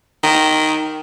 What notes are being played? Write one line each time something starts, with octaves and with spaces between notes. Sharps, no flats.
D#3